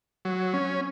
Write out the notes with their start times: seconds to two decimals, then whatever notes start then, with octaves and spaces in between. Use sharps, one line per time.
0.25 F#3
0.53 C#4